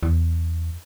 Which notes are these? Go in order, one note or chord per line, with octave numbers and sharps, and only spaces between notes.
E2